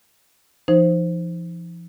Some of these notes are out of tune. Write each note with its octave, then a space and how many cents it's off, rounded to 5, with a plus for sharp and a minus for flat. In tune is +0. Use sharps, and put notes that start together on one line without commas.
F3 -40 D#4 +0 C5 +0